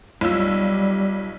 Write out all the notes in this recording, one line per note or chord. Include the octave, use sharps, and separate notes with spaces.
B1 G3 F4 E6